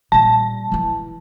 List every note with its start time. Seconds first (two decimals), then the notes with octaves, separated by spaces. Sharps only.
0.12 A#2 G3 A5
0.72 E3 E4